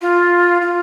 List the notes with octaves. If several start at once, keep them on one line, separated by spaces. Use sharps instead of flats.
F4
F4